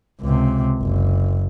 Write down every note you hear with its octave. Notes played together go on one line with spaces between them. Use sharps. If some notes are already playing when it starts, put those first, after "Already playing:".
C#2 C3
F#1